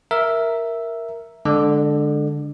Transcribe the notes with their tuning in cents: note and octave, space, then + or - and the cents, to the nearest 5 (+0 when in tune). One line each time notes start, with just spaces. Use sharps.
A#4 +0 E5 +0
D3 +0 G#3 +0 D5 +40